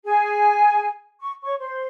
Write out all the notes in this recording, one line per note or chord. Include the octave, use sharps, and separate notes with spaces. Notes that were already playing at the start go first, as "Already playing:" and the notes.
G#4 G#5
C#6
C#5 C#6
C5 C6